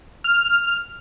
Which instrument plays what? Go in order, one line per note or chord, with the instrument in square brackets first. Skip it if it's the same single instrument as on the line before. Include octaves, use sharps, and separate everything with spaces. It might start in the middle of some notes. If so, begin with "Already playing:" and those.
[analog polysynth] F6